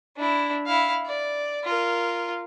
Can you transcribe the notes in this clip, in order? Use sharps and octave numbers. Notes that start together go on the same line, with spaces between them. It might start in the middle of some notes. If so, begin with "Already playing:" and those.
D4 E4
E4 F5
D5
F4 A#4